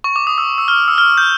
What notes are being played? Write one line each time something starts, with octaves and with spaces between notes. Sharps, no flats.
C#6
D6
D#6
E6
E6
F6
E6
F6
G6